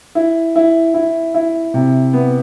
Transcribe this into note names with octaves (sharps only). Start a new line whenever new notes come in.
E4
E4
E4
E4
C3
B3